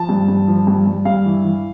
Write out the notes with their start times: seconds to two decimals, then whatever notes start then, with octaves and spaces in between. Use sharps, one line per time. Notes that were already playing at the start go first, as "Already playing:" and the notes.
Already playing: F3 A5
0.09 G2
0.28 G2
0.47 F3
0.67 G2
0.86 G2
1.05 G2 F5
1.25 E3
1.44 E3